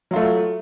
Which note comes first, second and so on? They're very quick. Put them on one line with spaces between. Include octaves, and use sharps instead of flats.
F#3 F4 A3